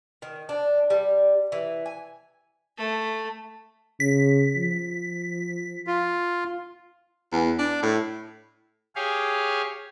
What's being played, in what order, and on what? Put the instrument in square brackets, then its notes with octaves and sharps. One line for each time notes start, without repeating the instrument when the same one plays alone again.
[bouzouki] D#3
D4
G3
E3
G#5
[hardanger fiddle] A3
[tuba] C#3 [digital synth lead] B6
[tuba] F3
[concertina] F4
[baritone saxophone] E2
D4
A2
[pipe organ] G4 G#4 C#5 F5